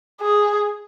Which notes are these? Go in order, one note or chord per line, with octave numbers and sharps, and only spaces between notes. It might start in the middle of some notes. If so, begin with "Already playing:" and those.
G#4